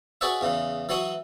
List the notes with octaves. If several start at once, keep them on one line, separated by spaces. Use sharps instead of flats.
F#4 G#4 B4 C#5 D5 E5
E2 C#3 E3
E3 F#3 E4 C#5 D#6